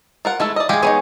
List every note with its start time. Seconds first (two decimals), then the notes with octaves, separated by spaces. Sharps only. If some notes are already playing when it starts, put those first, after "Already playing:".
0.25 F4 A#4 F#5
0.40 G#3 A3 E4 A4
0.56 D5 D#5
0.69 G#3 G4 G#4 F5 G5
0.83 B3 D#4 E4 G#4 C#5